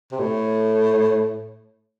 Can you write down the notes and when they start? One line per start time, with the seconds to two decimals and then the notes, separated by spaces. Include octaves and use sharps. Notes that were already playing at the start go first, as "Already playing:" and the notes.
0.12 C3
0.19 A2